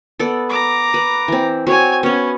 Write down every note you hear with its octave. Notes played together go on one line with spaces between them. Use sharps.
B3 A4 D5
A#5 D6
B4
E3 C4
C4 F#4 C#5 G#5
B3 C#4 C#5